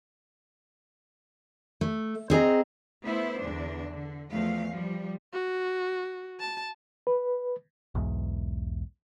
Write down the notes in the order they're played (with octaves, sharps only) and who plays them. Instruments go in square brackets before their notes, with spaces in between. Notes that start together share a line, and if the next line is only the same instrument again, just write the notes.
[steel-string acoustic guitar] A3
C4 G#4 D#5 A#5
[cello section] A3 B3 E4 C5
E2 D3 D4
D3
E2 F3 A3 F5
F3 G3
[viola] F#4
A5
[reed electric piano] B4
[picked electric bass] B1 E2 G#2